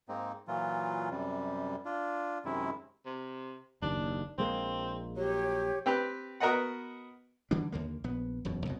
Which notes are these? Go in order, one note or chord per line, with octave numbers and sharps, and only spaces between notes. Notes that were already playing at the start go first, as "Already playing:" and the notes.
G#2 A#3 C4 D#4
A#2 E3 F#3 F4
F#2 C3 G3
D4 F4
F#2 C3 D#3 G#3 E4
C3
F#1 D#2 D4
A#1 G#3 A#3 C4
F#3 G4 C#5
C4 G4 B4
B3 F#4 A#4 B4 D#5 F#5
D3 E3 G3 D4
D#2 D3 A#3
A#1 B3
E1 F#2 B2
C2 F#2 B2